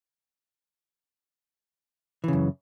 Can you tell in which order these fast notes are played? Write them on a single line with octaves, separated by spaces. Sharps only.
E3 C#3 F#2